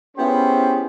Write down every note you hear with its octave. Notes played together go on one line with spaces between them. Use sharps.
B3 C#4 E4 G4 G#4 C5